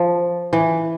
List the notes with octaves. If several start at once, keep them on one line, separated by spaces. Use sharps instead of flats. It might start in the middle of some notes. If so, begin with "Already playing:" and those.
Already playing: F3
E3